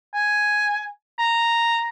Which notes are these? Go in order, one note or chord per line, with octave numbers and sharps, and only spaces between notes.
G#5
A#5